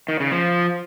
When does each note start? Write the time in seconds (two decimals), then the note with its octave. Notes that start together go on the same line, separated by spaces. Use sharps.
0.08 D#3
0.20 C#3
0.32 F3